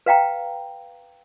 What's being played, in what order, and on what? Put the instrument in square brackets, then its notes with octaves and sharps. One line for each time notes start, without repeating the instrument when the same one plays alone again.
[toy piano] B4 F5 G5 A#5